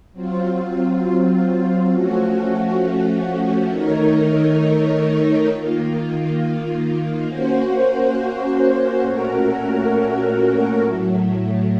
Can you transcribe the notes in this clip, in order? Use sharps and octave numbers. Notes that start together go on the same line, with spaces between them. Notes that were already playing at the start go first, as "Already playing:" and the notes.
F#3 C4 F4
F3 A3 C#4 F#4
D#3 A3 D#4 A#4 C#5
D#3 A#3 F4
A#3 C#4 F#4 C5
A#2 A3 C#4 F#4 A#4
A2 F#3 A3